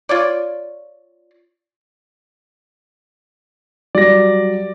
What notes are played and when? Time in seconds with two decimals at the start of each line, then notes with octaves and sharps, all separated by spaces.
0.09 F4 C#5 D5
3.95 F#3 G3 D5 A#6